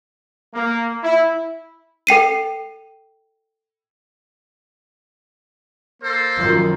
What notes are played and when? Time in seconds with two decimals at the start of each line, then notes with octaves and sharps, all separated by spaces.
0.54 A#3
1.03 E4
2.07 A4 G5 C7 D#7
6.02 A#3 A4 C5
6.40 F#2 D#3 F3